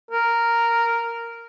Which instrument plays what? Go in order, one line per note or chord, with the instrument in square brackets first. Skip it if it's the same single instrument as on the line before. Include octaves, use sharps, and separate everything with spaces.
[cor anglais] A#4